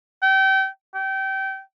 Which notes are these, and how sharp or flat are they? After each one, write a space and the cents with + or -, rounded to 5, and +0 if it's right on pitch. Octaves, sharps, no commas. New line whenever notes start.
G5 -30
G5 -25